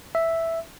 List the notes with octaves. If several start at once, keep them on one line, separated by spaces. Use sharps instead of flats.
E5